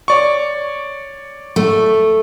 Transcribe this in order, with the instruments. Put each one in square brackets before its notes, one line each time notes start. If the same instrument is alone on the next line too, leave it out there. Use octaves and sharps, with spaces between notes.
[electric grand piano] C#5 D5 C#6
[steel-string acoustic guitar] A3